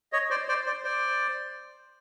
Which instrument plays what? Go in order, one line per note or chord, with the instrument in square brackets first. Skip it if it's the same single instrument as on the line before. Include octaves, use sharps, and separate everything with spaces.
[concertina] C#5 D#5
C5 D5
C5 D5
C5 D5
C5 D5